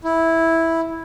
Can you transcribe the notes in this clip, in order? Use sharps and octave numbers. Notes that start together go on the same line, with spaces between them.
E4